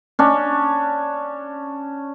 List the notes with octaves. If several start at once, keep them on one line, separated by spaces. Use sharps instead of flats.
C#4 D4